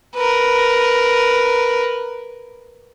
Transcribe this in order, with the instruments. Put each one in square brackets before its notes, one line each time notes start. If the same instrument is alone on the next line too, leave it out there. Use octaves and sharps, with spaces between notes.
[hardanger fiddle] A#4 B4